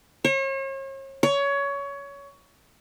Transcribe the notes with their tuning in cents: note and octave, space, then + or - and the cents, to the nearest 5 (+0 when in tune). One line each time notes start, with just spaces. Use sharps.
C#5 -40
C#5 +20